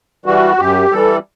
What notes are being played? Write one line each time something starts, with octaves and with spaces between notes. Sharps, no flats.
E3 G3 F#4
F#2 G4
E3 G3 A4